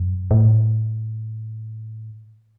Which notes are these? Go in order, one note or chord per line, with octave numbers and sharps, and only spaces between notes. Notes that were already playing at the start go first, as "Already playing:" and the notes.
Already playing: F#2
A2